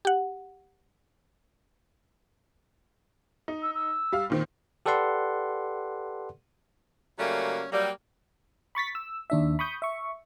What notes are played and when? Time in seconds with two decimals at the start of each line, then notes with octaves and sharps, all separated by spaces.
0.05 G4 F#5
3.48 D#4
3.63 E6
3.75 E6
4.12 G3 F5
4.30 A#2 D#3 C4
4.86 G4 A4 B4 D5 F#5 C6
7.19 C#3 F#3 G3 A3 A#3 C#4
7.72 F#3 G3 A#3
8.75 B5 C#6 A6 B6
8.95 E6
9.30 D#2 D4 E5
9.59 B5 C#6 D#6 G6
9.82 E5 C#6